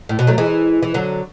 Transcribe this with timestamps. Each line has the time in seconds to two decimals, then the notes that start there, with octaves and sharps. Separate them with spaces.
0.09 A2
0.19 B2
0.27 F#3 A3
0.38 E3 G#3
0.83 E3
0.94 D3 F#3